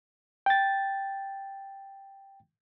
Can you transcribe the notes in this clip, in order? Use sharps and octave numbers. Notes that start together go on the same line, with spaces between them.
G5 A6